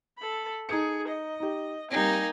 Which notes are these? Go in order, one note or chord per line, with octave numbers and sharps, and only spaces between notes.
A4 B5
D#4 G#4 C#7
D#5
D#4 G4
G3 A#3 C4 D#4 G5 G#5